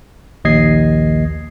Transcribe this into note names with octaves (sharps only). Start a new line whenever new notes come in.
A#1 D#2 D#5 G#6 C7